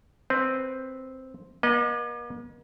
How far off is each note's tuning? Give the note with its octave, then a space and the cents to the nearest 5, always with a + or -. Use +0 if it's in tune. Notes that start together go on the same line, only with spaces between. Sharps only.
C4 +0 B4 +15
A#3 +45 D#5 -20